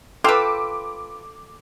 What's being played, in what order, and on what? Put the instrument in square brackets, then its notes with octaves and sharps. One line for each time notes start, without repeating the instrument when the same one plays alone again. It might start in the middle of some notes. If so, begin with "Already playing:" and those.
[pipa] F4 B4 [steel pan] A4 G5 E6 [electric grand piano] D6